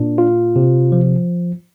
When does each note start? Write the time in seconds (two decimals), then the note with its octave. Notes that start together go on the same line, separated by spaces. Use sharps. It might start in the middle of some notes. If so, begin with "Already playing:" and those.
Already playing: A#2 D4
0.18 F4
0.56 C3
0.92 F3